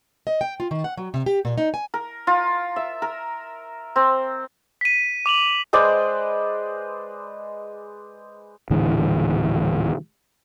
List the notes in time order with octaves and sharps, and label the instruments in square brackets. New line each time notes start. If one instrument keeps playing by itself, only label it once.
[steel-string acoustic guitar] D#5
G5
F4
D#3
F#5
F#3
C3
G4
A#2
D#4
G#5
[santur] A#4
F4
E5
A#4
C4
[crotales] B6 D#7
D6 F7 F#7
[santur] G#3 B4 C5 D5
[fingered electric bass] D#1 A2 D3 E3